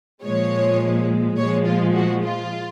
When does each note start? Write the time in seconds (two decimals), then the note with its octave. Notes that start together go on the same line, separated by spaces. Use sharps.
0.23 A#2 F3 G#3 C#5
1.37 A#2 F3 G#3 C#5
1.66 F4
1.94 F#4
2.23 F4